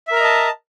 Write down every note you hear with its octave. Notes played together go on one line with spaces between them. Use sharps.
A#4 D#5 E5 A5 A#5